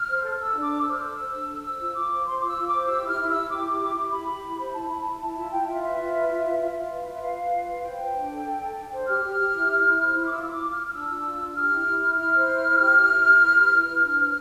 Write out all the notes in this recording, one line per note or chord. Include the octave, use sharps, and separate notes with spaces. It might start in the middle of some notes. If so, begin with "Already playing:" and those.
Already playing: F6
C5
A4
A4 E6
D4
D6
A4
E6
C5
F6
A4 E6
C5
D4
A4
C5 E6
F4
F4 D6
C5
C5 C6
F4 D6
E6
F4
D6
C5
G4 E6
E4 F6
E4
E4 E6
G4 D6
E4
G4
E4
G4 B5
G4
E4
C5
E4 A5
E4 B5
E4 A5
E4
F4 A5
F4 G5
F4 E5
B4 E5
F4
B4
F4
F4
F4
F4
B4
F4
E5
B4 F5
B4
F4
B4
C5 G5
C5
D4
A4
A4
A4
D4
C5
G4 F6
G4
G4
E4
E4
E4
C5
E4
D6
F4 E6
E6
F4 D6
F4
F6
F4
F6
D4 E6
F4
F4
D4
G4 F6
E4
E4
E4
E4 F6
C5
E4
C5
G4
E4
E4
G4
B4
G4
E4
B4
D4
C5